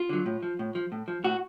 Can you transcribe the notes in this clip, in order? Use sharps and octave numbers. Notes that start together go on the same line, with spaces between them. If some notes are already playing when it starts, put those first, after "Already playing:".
Already playing: F4
D3 F#3
A2
F3
A2
F3
A2
F3
A2 F#4